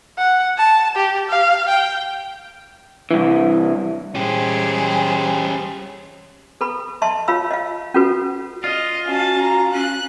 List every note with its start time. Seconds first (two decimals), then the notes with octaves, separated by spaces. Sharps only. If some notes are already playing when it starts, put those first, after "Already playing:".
0.18 F#5
0.58 A5
0.96 G4
1.29 F5
1.69 G5
3.11 C2 E3
4.15 G3 C#4 G4 G#4 C5
6.61 A4 B4 B5 C#6
7.02 D#5 E5 A5 C6 C#6
7.28 F4 C#5 F5 B5 E6
7.51 D#5 F5
7.94 C#4 F4 F#4 A4 B4
8.64 F4 D#5
9.07 C#4 F#4 A5
9.42 A#5
9.73 C#4 F#6